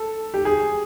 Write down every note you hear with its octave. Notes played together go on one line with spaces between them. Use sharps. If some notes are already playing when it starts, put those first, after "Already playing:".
Already playing: A4
G4
G#4